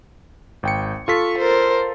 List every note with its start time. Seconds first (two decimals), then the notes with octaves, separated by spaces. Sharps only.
0.63 G#1 G5 C#7
1.08 F4 A4 C#6 B6
1.38 A#4 C5